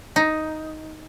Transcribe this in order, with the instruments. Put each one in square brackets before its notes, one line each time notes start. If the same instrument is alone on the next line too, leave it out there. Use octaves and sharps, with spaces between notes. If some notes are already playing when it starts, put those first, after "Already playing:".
[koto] D#4